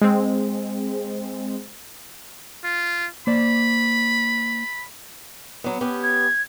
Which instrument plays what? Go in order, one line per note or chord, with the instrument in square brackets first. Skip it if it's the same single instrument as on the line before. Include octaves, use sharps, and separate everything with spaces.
[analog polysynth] G#3 C4
[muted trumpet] F4
[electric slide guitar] A#3 C5 D5 [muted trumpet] B5
[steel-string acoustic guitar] F#3 B3
B3 C#4 G4
[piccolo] G#6